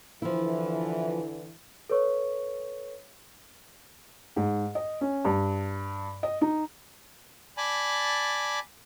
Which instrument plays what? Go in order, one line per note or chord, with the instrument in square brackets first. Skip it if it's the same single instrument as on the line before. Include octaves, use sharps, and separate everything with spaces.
[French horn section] D3 E3 [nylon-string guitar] F3 E4
[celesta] A4 B4 C#5 C#6
[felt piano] G#2
D#5
C#4
G2
D#5
D#4
[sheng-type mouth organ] D5 G#5 A5 B5